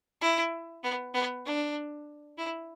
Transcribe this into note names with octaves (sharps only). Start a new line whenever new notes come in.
E4
B3
B3
D4
E4